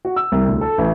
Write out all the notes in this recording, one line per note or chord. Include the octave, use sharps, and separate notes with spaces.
F#4
E6
C2
D2
A4
A1